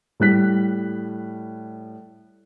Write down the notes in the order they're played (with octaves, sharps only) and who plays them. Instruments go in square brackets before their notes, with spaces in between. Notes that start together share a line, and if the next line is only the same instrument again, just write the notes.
[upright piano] A2 G3 F#6 B6